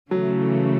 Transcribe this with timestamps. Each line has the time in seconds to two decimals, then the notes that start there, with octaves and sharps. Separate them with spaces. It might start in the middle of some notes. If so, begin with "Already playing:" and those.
0.11 C#3 E3 F#3 A3